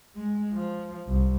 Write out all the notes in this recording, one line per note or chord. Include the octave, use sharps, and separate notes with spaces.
G#3
F3
C2